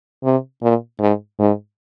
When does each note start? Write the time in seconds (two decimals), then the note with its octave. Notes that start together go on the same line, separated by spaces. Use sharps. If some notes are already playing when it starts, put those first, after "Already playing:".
0.24 C3
0.62 A#2
1.00 G#2
1.39 G#2